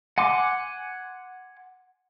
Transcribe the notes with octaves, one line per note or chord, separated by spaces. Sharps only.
F#5 G#5 C6 D6